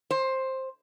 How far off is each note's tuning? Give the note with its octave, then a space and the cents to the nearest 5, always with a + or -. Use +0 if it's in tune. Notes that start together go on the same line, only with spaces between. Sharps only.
C5 +10